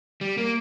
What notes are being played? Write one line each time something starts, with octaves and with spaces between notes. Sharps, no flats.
G3
A#3